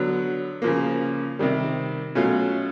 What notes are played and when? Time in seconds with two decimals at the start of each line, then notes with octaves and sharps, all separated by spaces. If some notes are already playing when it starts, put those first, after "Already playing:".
Already playing: D3 F#3 B3
0.62 C#3 F3 A#3
1.39 C3 D#3 G3
2.15 B2 F#3 A3 C#4 F4